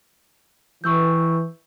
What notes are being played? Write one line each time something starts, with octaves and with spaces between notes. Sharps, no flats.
E3 C#6 E6 G6